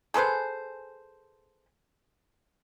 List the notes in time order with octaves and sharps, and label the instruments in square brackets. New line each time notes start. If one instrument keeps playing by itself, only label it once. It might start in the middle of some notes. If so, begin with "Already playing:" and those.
[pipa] G#4 A4 B4 C5